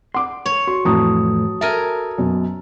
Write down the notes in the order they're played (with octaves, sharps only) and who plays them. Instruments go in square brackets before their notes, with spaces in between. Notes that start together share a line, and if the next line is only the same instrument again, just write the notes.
[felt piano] F#5 D6 [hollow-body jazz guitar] C6
[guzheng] C#5
[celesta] F#4 [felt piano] C6
[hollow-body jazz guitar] F2 A2 E3 [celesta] F#4 D#6 [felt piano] A5 A#5
[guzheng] A4 A#4 G#5 [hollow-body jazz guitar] E5
[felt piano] F#2 B2